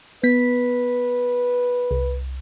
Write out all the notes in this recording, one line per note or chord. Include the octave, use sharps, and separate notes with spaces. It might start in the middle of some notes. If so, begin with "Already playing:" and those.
B3 B4 B6
C2